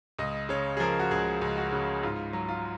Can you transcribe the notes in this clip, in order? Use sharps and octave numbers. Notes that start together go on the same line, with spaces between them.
C#2 D#5
C#3 C#5
G#4
F3 A#4
F#4
C#2 G#4
C#2
F#4
C#3
G#2 F4
F#3
F4